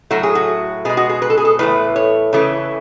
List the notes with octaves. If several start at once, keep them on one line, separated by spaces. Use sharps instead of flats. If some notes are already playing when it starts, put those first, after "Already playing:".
A2 F#3 A3 F#4
G#4
F#4
B2 G#3 G#4
F#4
G#4
B4
A4
G#4
A4
A2 E3 A3 B4
C#5
C#3 E3 A3